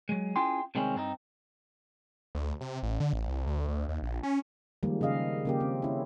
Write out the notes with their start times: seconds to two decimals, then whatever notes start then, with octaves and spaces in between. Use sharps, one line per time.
0.09 F#3 G#3
0.36 C#4 E4 F4 G#4 G5 C6
0.75 C3 D#3 G3 G#3 C4 C#4
0.95 G2 C4 D4 D#4
2.35 D2
2.61 C3
2.83 A1
3.00 D3
3.13 A1
3.28 C2
3.47 D2
3.68 D2
3.89 D#2
4.02 A#1
4.23 C#4
4.83 D#3 F3 G3 G#3 A#3
5.01 C#3 G#4 D#5 F5
5.45 C#3 A#3 G4
5.60 C4
5.82 C#4 E4